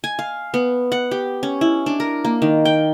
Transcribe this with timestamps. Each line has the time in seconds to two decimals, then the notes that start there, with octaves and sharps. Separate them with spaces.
0.04 G#5
0.19 F5
0.54 B3
0.92 F#5
1.11 G4
1.43 C#4
1.61 E4
1.86 D4
2.00 A#4
2.25 A#3
2.42 D#3
2.65 G5